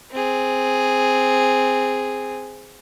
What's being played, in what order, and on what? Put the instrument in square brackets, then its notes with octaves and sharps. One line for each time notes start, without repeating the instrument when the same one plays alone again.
[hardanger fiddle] C4 G#4